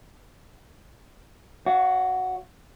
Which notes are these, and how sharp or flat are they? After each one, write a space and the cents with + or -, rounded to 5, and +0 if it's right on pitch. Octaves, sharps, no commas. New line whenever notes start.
F#4 +0 C#5 +40 F5 -30